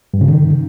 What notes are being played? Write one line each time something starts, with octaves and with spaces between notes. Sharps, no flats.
G2
C#3
D#3